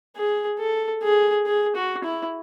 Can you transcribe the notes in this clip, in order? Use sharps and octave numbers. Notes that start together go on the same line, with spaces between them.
G#4
A4
G#4
G#4
F#4
E4